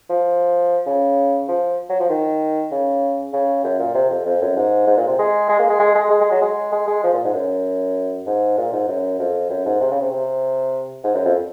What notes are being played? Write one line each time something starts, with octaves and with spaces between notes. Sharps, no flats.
F3
C#3
F3
F#3
F3
D#3
C#3
C#3
F#2
A#2
C3
F2
F2
F#2
G#2
G#2
A#2
C3
G#3
G#3
A#3
G#3
G#3
G#3
G#3
G#3
F#3
G#3
G#3
G#3
F3
A#2
G#2
F#2
G#2
A#2
G#2
F#2
F2
F#2
G#2
C3
C#3
C3
C3
G#2
F#2
F2